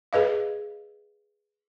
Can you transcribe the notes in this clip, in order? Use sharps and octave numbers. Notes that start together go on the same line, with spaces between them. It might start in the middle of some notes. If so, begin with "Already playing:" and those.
G#4 B4 D#5 F5